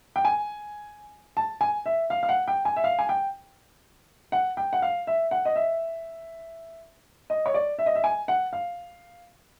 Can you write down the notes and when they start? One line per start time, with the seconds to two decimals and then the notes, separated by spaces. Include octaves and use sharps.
0.16 G5
0.25 G#5
1.37 A5
1.61 G#5
1.86 E5
2.10 F5
2.23 F5
2.29 F#5
2.48 G5
2.65 G#5
2.76 E5
2.84 F5
2.99 G#5
3.09 G5
4.32 F#5
4.57 G5
4.73 F#5
4.82 F5
5.07 E5
5.31 F#5
5.45 D#5
5.56 E5
7.30 D#5
7.46 C#5
7.54 D5
7.79 E5
7.86 D#5
7.95 E5
8.04 G#5
8.28 F#5
8.53 F5